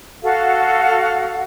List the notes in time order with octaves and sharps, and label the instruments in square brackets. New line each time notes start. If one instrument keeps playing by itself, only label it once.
[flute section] F#4 A4 F5 F#5